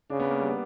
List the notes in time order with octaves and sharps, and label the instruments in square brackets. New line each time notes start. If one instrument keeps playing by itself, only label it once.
[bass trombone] C#3 [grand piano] D4
[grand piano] B3
A#3
G3
B3